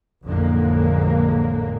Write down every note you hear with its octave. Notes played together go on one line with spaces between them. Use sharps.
A1 F2 D3 G#3 A#3